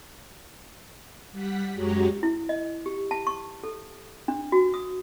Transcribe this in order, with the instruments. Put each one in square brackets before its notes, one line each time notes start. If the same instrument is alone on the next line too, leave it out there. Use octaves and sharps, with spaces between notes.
[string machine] G3 F#5 B6
F#2 G#3 F#4 G4 C#5 A#5
[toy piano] E4
D#5
G4
A5
C#6
A4
D4
F#4
D#6